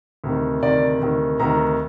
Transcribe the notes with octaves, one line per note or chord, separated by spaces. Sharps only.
D2 C3 D#3
D2 C3 D#3 D5
D2 C3 D#3
D2 C3 D#3 A#5